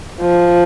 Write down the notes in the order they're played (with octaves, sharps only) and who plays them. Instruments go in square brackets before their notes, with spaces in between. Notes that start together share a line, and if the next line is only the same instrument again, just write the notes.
[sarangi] F3